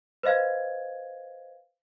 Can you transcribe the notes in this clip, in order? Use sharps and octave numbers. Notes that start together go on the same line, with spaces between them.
B4 C5 D#5 F5 G#6